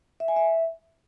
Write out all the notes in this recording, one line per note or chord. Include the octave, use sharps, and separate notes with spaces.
E5
G#5
E5